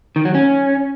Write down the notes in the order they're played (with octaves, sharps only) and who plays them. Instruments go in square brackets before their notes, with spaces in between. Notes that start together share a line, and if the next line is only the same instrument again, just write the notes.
[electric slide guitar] D#3
F#3
C#4